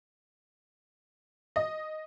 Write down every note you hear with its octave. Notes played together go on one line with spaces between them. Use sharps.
D#5